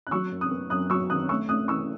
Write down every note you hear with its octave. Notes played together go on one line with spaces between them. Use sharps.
F#6
F#3 C#6 E6
F#2
D#6 F#6
B3
F#2 D#6 F#6
F#3 C#6 E6
D#3 D#6 F#6
A3 C#6 E6
A3 D#6 F#6
E3 C#6 E6